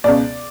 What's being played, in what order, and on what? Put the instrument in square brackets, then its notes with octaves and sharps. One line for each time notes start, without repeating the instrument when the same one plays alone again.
[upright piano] C#2 B2 D5